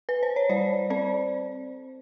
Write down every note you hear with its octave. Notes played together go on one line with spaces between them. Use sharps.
B4
C5
C#5
G3 C5 D5
C4 C5 D5